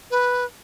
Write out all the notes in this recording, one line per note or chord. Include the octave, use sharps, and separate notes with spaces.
B4